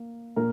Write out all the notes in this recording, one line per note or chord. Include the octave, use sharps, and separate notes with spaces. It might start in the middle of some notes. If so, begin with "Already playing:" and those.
Already playing: A#3
A#2 A#4